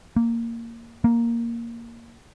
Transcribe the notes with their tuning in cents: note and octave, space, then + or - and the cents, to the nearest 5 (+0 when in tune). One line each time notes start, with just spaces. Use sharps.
A#3 -10
A#3 +0